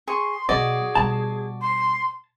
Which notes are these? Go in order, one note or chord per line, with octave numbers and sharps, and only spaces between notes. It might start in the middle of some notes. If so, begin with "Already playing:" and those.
G#4 C6 C#6
B2 F#3 F#4 G#4 D5 D#5
B2 G3 A5
C6